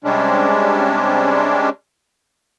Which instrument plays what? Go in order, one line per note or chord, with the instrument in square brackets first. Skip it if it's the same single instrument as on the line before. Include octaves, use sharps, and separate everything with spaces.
[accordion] C3 G3 G#3 C#4 D4